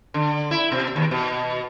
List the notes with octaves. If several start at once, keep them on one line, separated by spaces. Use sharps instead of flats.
D3
E4
B2
D#2
B2